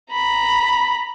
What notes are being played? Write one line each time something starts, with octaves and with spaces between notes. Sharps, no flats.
A#5 B5